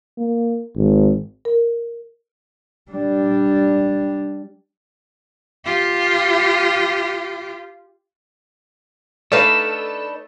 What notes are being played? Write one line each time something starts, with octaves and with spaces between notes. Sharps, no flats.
A#3
G#1
A#4
G3 D4
F4 G4
A3 D4 D#4 A4 B4 F5